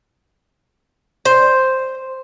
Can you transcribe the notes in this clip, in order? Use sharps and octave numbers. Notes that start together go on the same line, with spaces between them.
C5